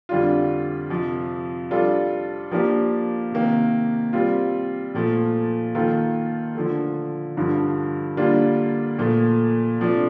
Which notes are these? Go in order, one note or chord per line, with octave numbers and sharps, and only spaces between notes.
F2 D3 G3 D4 F4
F2 C3 F3
G3 D4 F4 A4
F3 A#3 D4 G4 A#4
C3 D#3 A#3
G3 C4 F4
A#2 F3 A3
D#3 A#3 F4 A4
D3 F3 A3
G2 D3 F3
D3 G3 A#3 D4 F4
A#2 F3 A3
C3 F3 A3 D4